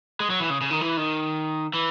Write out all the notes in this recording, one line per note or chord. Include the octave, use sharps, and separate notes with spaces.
G#3
F#3
E3
C#3
C#3
D#3
E3
D#3
E3